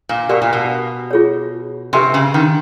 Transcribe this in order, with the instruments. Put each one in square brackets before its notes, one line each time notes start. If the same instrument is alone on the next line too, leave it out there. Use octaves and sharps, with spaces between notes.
[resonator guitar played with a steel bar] A#2
[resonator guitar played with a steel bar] B2 [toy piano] G4 A#4 D5 G5
[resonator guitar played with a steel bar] A#2
B2
[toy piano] F4 G#4 C#5
[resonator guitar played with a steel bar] C3 [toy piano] G4 B4 E5 G#5 C6
[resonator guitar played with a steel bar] C#3
D#3